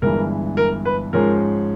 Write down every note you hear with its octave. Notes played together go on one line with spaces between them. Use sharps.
G1 G2 E3 G#3 A#4
A#4
B4
G#2 F3 G#3 C#4 A#4